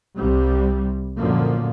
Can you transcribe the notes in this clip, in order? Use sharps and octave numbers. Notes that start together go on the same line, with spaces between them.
C2 C3 G3
F#2 A#2 D3 F3 A#3